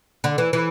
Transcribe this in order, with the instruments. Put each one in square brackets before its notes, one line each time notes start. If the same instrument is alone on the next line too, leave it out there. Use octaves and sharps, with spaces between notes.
[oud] D3
E3
E3